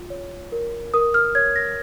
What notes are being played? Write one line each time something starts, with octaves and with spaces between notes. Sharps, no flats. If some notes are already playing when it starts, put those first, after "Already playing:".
Already playing: F4
C#5
A#4
A#4 D#6
F6
C#5 G#6
A#6